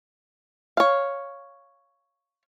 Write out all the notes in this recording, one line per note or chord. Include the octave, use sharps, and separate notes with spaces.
C#5 F5